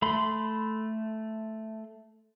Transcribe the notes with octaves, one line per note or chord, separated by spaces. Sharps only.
A3 B5 C6